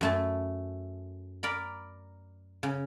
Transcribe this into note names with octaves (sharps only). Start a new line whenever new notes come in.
F#2 A3 A5
A#4 D5 B5
C#3